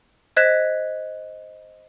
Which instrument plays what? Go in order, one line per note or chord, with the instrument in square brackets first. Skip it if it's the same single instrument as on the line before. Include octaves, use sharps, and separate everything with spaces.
[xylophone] C5 D#5 F#6 G#6 B6 E7